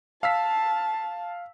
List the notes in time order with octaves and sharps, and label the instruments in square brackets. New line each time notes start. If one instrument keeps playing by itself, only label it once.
[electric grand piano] F5 E6 B6 [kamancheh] A5